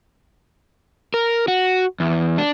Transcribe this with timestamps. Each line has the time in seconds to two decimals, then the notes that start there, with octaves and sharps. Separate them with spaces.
1.14 A#4
1.48 F#4
2.00 E2
2.38 D4